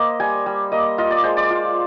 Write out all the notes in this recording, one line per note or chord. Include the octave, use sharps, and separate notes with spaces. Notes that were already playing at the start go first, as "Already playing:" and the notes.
Already playing: A#3 C5 D#5
G3 G#5
G3
A#3 D#5
F4 D#5
D5
G#3 C5
D5
F4